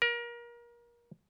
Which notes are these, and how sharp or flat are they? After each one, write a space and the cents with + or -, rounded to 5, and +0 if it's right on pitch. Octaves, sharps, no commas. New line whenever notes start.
A#4 +30